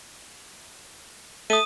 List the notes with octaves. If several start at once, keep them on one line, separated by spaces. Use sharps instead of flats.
A3 D#6 D#7